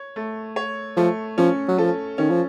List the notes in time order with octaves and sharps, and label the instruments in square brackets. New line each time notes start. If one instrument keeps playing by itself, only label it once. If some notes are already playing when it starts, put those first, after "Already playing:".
Already playing: [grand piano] C#5
A3
C#5
[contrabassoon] F3 [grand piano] A3
[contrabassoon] F3 [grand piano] C#4
[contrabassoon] F#3
[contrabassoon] F3 [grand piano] A4
[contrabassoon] D#3 [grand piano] C#4
[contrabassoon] F3